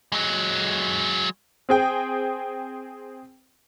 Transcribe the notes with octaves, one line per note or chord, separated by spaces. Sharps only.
F#3 G#3
C4 G#4 G5